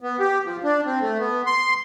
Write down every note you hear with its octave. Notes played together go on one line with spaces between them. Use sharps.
B3
G4
F3
D4
C4
A3
B3
C6